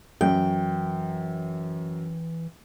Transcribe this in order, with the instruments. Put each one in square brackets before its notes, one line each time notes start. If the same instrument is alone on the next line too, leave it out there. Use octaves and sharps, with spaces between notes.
[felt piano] F#2 [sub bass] E3 [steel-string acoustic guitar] G5